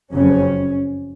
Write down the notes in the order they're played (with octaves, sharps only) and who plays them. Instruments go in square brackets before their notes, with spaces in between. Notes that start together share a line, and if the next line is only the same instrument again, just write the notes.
[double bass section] F#1 F2 C#3 C#4